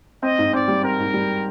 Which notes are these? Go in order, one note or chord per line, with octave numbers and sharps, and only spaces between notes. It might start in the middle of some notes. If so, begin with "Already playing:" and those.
C4 D#5
G#2
C4 D5
G3
C4 A#4
G#2
G3